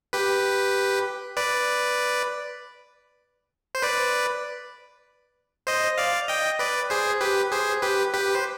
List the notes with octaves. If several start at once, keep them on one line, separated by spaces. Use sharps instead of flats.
G4 B4
B4 D5
C5
B4 D5
C5 D#5
D5 F5
D#5 G5
B4 D5
G#4 C5
G4 B4
G#4 C5
G4 B4
G4 B4
C5